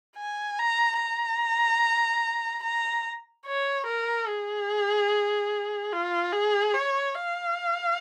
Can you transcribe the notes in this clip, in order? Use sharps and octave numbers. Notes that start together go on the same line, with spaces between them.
G#5
A#5
A#5
A#5
C#5
A#4
G#4
F4
G#4
C#5
F5